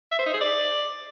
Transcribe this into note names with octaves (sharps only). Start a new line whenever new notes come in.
E5
C5
D#4
G#4
D5